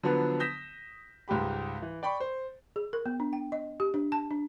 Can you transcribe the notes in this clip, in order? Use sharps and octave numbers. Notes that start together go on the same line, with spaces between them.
D3 F3 F#3 B3 D4 B4
D#6 G6 A#6 B6 E7
C#2 G#2 G3 G4 B5
E3
D5 G5 B5 C#6
C5
G#4
A#4
B3
D4
G5
D#5
G4
D4
A5
D4